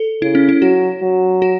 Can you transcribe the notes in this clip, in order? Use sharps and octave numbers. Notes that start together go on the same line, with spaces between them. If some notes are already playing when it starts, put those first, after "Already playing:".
Already playing: A4
C#3 E4
C#4
E4
F#3 F#4
F#3
F#4